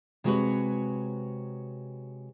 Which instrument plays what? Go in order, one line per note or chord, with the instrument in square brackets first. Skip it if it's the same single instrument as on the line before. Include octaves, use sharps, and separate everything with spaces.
[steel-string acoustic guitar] C3 G#3 F#4 G4 B4 C#5